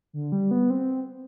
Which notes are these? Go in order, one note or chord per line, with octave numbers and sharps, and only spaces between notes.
D3
G3
B3
C4